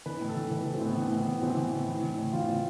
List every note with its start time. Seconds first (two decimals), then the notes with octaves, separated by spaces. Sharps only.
0.06 E3 B4
0.21 A2
0.29 A4
0.36 E3
0.51 E3 B4
0.63 E3 A4
0.74 C4
0.81 A2 B3
0.97 E3
1.12 A2
1.19 B3
1.28 E3
1.42 E3 C4
1.57 E3
1.73 A2
1.88 E3
2.03 E3
2.19 A2
2.33 E3 F4
2.49 A2